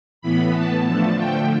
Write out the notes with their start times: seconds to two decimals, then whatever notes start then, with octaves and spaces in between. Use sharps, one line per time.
0.22 A2 E3 B3 B5
0.54 A5
0.86 D3 F3 A3 A5
1.17 G5